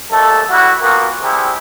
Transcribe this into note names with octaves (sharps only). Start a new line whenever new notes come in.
D#2 A3 A4
G3 E4 F#4
A#2 B3 F#4 A#4
C3 G3 E4 G#4